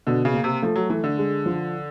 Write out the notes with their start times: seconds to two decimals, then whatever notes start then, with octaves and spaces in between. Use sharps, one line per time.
0.07 B2 D3
0.25 C#3
0.34 A#3
0.44 C3
0.62 F3 A3
0.76 F#3
0.90 E3 A3
1.04 D3
1.18 G#3
1.46 F3